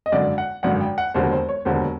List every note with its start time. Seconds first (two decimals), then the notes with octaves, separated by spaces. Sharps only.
0.06 D#5
0.12 G#1 F#2 D3 D5
0.38 F#5
0.63 G#1 F#2 D3 F#5
0.81 G5
0.98 F#5
1.14 E1 D#2 D3 F#3 C5
1.32 C5
1.49 C#5
1.65 E1 D#2 D3 F#3 C5